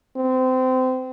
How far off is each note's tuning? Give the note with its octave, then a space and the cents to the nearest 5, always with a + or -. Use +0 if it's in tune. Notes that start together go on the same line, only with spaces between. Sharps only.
C4 -25